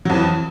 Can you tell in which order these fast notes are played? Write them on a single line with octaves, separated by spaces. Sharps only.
F#3 F2 E3